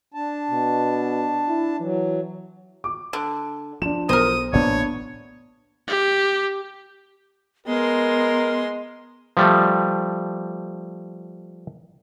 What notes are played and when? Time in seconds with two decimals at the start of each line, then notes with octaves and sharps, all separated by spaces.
0.14 D4 A5
0.51 B2
1.48 E4
1.80 E3 F#3
2.84 D6
3.13 D3
3.82 F3 D4 E7
4.09 B1 A#4 C5 D#6
4.53 A1 A2 A#3 B3 D4 C#5
5.88 G4
7.66 G#3 B3 A#4 C6
9.37 F3 G3 A3